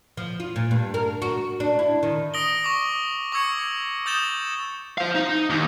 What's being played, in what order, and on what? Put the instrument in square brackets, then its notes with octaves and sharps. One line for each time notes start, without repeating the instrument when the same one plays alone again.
[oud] F3
F4
A#2
G2
A#4
F#4
D4
E4
D#3
[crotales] D#6 A#6 D7 F#7 G7
C#6 D6
C#6 D6 E6 G#6 C#7
D#6 G6 A6 E7 G7
[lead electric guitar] C5 F5
D#4
D#2